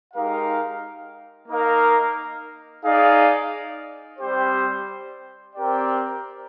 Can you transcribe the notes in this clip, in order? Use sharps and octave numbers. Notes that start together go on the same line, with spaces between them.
G#3 D#4 G4 A#4 F5
A#3 D#4 A#4 F5
D#4 G#4 D5 F5
G3 C4 G4 C5
C4 G4 A#4 D5 G5